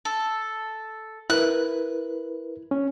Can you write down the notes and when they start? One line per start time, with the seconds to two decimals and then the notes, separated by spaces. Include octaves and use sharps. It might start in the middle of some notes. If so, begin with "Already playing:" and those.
0.05 A4
1.30 E4 A#4 B4 F#6
2.71 C#4